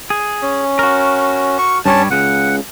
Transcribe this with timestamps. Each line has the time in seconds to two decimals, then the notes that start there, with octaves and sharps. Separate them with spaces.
0.10 G#4
0.42 C#4
0.79 F#4 A#4
1.58 C#6
1.86 G2 G3 C#4 C#5 A5
2.11 C#2 C#3 F#5